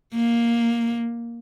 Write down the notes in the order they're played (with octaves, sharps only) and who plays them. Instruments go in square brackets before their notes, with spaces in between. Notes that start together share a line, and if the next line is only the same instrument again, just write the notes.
[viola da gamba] A#3